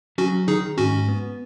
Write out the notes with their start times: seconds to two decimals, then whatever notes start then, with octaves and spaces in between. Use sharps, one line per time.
0.18 F#3 C#4 F#4
0.48 D#3 D#4 G#4
0.78 G#2 C#4 F#4
1.09 B3